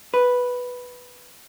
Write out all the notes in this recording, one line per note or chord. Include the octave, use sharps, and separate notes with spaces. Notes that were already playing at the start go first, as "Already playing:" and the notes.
B4